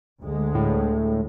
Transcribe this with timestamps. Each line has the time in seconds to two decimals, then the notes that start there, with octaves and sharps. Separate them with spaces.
0.21 D2 G#3
0.55 A2